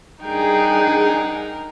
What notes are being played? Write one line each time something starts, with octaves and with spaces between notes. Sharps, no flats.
G3 D4 D#4 G#4 A#4 F#5 G5